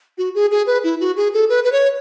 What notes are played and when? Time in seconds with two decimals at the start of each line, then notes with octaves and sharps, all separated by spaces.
0.18 F#4
0.35 G#4
0.51 G#4
0.67 B4
0.84 E4
1.00 F#4
1.17 G#4
1.34 A4
1.49 B4
1.64 B4
1.72 C#5